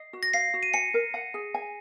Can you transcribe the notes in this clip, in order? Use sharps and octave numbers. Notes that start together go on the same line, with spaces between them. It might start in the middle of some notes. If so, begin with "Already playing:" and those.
Already playing: D#5 C7
F#4
A#6
F5 C7
F#4
D#7
G#5 C#7
A#4
F#5
G#4
G#5